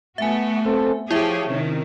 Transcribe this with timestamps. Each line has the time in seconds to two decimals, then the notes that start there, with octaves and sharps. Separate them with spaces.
0.18 A3 B3 F#4 E5 G#5
0.65 C4 A4
1.11 F3 E4 G4 G#4 C#5 E5
1.48 C3 D#3 C#4